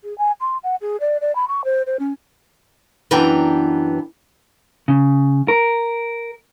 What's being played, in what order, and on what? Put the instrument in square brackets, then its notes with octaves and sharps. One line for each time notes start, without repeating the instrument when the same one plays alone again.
[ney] G#4
G#5
C6
F#5
G#4
D5
D5
B5
C#6
C5
C5
C#4
[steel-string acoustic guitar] F#2 E3 B3 D4 G5 A#5
[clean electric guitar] C#3
A#4